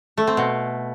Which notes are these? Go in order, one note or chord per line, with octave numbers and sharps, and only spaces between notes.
A3
C4
B2